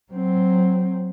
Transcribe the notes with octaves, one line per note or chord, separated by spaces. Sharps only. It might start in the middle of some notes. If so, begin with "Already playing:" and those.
F#3 C4